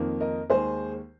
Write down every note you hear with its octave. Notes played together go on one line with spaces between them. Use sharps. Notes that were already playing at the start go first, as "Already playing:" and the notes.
Already playing: F2 D#3 A#3
A#4 D#5
D#2 D#3 G#3 G#4 C5